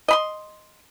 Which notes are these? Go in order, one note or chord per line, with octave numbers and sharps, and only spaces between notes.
D#5 B5 C6